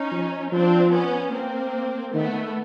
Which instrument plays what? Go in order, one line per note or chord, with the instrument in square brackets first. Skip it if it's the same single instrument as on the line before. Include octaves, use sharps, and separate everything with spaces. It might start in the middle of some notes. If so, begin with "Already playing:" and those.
Already playing: [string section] C#4 D#4
[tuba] F3
[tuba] F3 [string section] C4 D4
[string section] B3 C#4
A#3 C4
[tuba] D#3 [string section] A3 B3